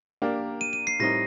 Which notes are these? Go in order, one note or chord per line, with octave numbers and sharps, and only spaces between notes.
A#3 D4 G4 A#4
D#7
D#7
C7
A2 G3 C4 D#4 A#4 A#6